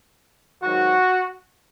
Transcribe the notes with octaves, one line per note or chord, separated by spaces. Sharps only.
G#2 D#3 F#3 F#4